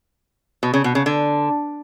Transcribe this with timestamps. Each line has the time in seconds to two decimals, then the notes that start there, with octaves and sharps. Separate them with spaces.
0.63 B2
0.74 C#3
0.84 B2
0.95 C#3
1.06 D3